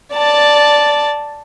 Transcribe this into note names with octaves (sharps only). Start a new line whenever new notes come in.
D5 A5